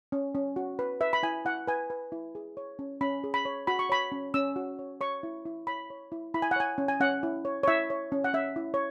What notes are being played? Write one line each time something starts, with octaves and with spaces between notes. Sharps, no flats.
C#4
C#4
F#4
B4
B4 E5
B5
E4 G#5
E4 F#5
B4 G#5
B4
E4
G#4
C#5
C#4
C#4 B5
G#4
B5
C#5
F#4 B5
C#6
C#5 B5
C#4
C#4 E6
F#4
C#5
C#5 C#6
E4
E4
C#5 B5
C#5
E4
E4 B5
G#5
F#5
C#5 G#5
C#4
G#5
C#4 F#5
E4
C#5
C#5
E4 E5
C#5
C#4
F#5
C#4 E5
E4
C#5